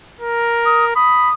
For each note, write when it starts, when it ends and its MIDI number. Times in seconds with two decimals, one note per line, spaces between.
0.21 0.94 70
0.66 0.85 87
0.96 1.30 83
0.96 1.34 87